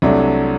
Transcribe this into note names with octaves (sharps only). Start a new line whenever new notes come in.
C2 C3 F#3 A3 D4